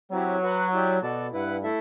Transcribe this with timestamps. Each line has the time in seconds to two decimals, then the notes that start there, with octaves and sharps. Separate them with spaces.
0.11 F#3 C4 E4 G4
0.42 F#4 B4 F#5
0.73 E4 G4 D5 G5
1.02 B2 F#4 A4 D5 A5
1.33 G2 E4 B4 F#5
1.63 A3 E4 A4 E5